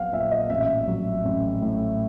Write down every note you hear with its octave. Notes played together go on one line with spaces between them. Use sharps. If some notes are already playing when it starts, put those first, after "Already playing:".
Already playing: A#1 F#3 B3 F5 F#5
A#2 E5
D#5
A1 E5
F#3
A1
A2